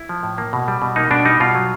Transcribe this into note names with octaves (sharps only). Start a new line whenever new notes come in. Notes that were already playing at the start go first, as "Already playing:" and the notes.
Already playing: E4
F3
A2
A#3
B2
G3
B2
A#3 D#4
B2 D4
G3 D#4
B2 F4
F#3